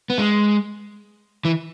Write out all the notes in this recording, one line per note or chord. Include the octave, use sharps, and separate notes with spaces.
B3
G#3
E3